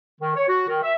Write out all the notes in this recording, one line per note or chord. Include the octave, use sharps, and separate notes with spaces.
D#3
C#5
F#4
D#3
E5